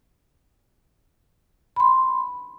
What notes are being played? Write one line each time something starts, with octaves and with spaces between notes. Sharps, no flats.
B5 C6